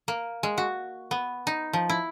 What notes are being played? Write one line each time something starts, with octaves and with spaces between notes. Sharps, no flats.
A#3
G#3
F#4
B3
D#4
F3
E4